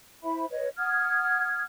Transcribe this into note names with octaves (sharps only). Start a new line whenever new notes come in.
E4 C5 E5 B5
B4 C#5 D#5
F#5 D#6 F6 G#6